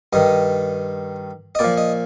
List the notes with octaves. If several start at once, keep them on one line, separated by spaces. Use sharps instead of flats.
G2 D#3 D#5
D#5
A#2 F3 D5
D#5